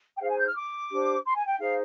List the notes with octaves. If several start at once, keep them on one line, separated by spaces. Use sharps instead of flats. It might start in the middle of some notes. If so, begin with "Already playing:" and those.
G5
D#4 G#4 C5 F5
G#5
G6
F6
D6
D4 G4 C5
C6
G#5
G5
D#4 G#4 C5 F5